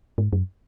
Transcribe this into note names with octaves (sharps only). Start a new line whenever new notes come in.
G#2
F#2